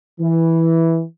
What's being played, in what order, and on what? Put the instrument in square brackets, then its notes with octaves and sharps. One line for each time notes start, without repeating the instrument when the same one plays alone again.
[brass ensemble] E3